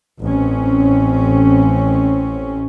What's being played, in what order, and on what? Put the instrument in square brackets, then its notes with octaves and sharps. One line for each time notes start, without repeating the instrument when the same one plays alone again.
[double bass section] A1 C4 C#4